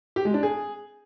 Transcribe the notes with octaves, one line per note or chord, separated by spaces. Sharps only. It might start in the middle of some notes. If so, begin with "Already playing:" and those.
G4
G#3
D4
G#4